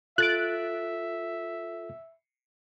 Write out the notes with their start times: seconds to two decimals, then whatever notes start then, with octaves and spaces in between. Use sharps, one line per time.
0.18 F4 A4 E5 F#6 A6 D7